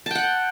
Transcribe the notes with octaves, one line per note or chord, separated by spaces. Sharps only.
F#5 G5 A5